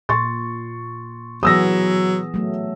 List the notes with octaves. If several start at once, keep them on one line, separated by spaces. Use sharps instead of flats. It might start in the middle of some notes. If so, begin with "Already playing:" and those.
A#2 C6 C#6 A6
E3 F#3 B3 G#4 D#6 E6 A#6
F#3 A3